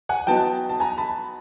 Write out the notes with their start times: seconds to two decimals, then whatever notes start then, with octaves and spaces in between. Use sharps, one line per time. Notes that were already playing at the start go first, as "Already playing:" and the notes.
0.09 F#5 G#5
0.27 F#3 B3 D#4 G5 A5
0.69 A5
0.80 G#5 A#5
0.98 A5 B5